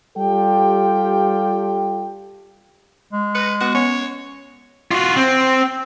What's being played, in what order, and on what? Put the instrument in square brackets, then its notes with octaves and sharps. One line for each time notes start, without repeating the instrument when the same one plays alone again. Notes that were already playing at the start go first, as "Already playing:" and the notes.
[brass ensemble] G3 F4 G4 A4 G5
[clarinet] G#3
[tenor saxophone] B4 [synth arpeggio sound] A#6 C#7
[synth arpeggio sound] B3 F#5 [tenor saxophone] F#4
[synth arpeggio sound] B3 C#4 [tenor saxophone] C#5
[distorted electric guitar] F4 F#4
C4